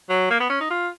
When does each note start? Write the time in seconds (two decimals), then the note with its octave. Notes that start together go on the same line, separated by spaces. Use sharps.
0.10 F#3
0.30 A#3
0.40 B3
0.49 C#4
0.61 D#4
0.70 F4